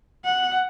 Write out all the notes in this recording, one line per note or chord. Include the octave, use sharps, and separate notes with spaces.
F#5